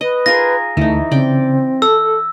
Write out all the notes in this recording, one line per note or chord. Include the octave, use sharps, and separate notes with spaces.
B4 D#5
F4 G#4 A#4 A#6
D2 E3 A3 D#4
C#3 C4 D5 G5
A4 E6